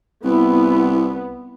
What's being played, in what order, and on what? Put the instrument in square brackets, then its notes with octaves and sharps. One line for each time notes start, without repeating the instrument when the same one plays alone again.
[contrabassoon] C2 [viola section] B3 [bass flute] E4